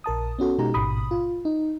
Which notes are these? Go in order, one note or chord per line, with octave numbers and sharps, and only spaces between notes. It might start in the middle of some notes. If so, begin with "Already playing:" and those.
A#1 A#4 A5 D#6
B3 C#4 F#4 A4
B2 G#3 D#4 G4 A#5
A1 G#2 B2 B5 D#6
F4
D#4